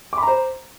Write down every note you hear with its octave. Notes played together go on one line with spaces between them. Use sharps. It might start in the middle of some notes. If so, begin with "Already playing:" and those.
C5 A#5 B5 D6